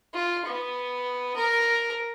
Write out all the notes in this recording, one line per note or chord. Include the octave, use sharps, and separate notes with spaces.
F4
B3
A#4